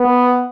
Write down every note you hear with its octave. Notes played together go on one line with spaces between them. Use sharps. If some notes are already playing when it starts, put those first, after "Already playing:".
Already playing: B3